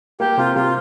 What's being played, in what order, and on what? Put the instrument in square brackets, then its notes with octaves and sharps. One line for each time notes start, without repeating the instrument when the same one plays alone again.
[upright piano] A#3 [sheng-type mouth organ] G4
[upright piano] C3 [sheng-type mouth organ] F4
[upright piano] C3 [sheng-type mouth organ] F4